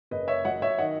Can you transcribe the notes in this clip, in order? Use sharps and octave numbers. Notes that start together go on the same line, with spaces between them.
F#1 B4 D#5
C#5 E5
F#3 D#5 F#5
C#5 E5
D#3 D#5 F#5